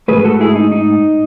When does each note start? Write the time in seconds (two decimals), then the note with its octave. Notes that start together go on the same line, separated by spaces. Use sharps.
0.08 G#2 D#3 A3 G#4 B4
0.25 F#4 A4
0.40 E4 G#4
0.55 D#4
0.72 D#4